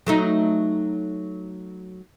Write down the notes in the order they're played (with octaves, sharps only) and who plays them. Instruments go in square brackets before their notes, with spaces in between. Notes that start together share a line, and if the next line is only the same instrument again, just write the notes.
[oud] F#3 A3 D#4